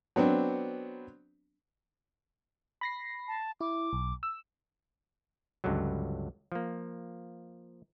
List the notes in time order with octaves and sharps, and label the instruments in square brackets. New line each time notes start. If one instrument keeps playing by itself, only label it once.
[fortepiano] F#3 B3 C4 D4
[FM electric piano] B5 A#6 C7
[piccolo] A5
[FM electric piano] E4 [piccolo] D6
[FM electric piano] B1
E6
[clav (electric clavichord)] C#2 G2 D3 F#3
F3 A#3